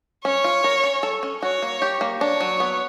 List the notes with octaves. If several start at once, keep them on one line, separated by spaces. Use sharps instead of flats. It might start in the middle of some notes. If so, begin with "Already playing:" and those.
C#4 C#5
F4
A#4
C#4
A4
C#4
F#4 C#5
A#3
G4
A#3
D4 C#5
F#3
B3